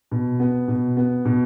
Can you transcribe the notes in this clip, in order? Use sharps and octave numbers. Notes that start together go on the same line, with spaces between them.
B2
B3
B2
B3
B2